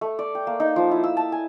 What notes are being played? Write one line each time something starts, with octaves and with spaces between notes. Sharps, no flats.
A3
D5
G5
A#3
D#4
F3
E4
E6
A5
G#5